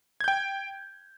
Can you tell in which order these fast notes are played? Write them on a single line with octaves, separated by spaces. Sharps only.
G#6 G6 G5